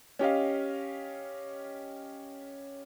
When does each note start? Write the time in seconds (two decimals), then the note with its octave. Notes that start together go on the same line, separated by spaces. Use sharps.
0.19 C#4 G4 D#5 F5